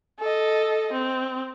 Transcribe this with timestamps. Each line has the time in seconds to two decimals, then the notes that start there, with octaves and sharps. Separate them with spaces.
0.20 A4 D#5
0.93 C4